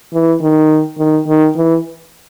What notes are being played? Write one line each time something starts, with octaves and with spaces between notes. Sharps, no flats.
E3
D#3
D#3
D#3
E3